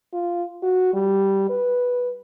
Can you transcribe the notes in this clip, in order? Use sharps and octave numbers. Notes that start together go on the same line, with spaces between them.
F4
F#4
G3
B4